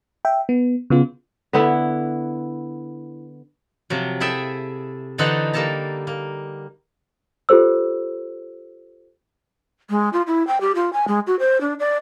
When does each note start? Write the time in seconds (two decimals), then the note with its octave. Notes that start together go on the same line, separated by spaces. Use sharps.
0.25 E5 G5
0.49 B3
0.90 C#3 B3 F4
1.53 D3 B3 E4
3.90 C3 F3 F#3
4.20 E4 G#4 A4 E5 G5
5.18 D3 E3 D#4 A4 C5 F#5
5.53 G3 A#3 A4 A5 A#5
6.07 A#3
7.49 F4 G4 A4 C5 E6
9.90 G#3
10.13 F4
10.27 E4
10.47 G5
10.61 G4
10.75 F4
10.93 G#5
11.08 G#3
11.27 F#4
11.40 C5
11.61 D4
11.80 D5